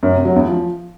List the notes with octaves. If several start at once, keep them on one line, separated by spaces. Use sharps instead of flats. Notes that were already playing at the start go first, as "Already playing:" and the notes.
F#2
C3
F#3
E2
F3